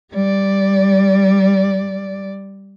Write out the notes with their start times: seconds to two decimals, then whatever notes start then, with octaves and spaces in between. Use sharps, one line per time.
0.12 G3 D5